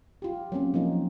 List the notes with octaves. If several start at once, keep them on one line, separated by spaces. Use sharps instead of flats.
F4 G4
F#3 A#3 C4 C#4
F3 F#3 A#3 D#4